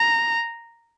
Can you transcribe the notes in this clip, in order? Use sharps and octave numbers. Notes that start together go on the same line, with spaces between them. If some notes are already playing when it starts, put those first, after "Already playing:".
Already playing: A#5